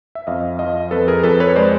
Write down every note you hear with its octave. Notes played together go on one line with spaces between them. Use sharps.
E5
F2 D#5 F5
F3 D#5 F5
F2 A4 B4
G#4 A#4
F2 A4 B4
B4 C#5
G#3 C5 D5